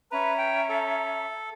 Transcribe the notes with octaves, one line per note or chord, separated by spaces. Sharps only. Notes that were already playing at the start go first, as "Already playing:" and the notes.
C#4 B4 E5 A#5
G5
A4